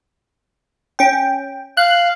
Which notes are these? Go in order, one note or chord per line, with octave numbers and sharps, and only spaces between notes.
C#4 G5
F5 F#6